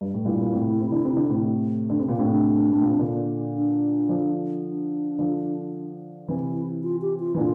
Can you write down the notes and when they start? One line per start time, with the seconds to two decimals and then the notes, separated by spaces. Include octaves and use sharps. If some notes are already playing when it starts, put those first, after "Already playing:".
0.01 G2
0.14 A2
0.25 G2 A#2 E4
0.41 A#2
0.52 A2 C3
0.81 C3
0.92 D3
1.05 C3
1.17 D3
1.30 A2 C3
1.89 D3 D4
2.00 C3 C4
2.09 A#2
2.17 A2 C3 D4
2.31 D4
2.72 A2
2.81 A#2
2.91 C3
2.99 A#2 D3
3.55 D4
4.09 D3 F3
4.64 D4
5.19 D3 F3
6.28 C3 E3 E4
6.83 F4
7.02 G4
7.20 F4
7.35 E3
7.38 A#2 D3 F4